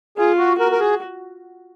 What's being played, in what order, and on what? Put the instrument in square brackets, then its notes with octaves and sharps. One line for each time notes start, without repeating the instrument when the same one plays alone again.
[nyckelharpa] F4 [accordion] G#4
[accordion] F#4
[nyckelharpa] F#4 [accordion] A#4
[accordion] A#4
G#4